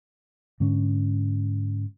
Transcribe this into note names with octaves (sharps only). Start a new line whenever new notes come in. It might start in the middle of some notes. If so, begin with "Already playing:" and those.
G#2 D3 C#4